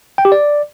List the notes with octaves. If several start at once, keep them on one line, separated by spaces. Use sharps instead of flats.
G5
G4
D5